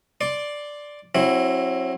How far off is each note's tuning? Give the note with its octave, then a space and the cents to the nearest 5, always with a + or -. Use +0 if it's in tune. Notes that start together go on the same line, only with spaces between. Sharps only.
D5 +0 C6 +15
F#3 +0 C4 +30 E4 +0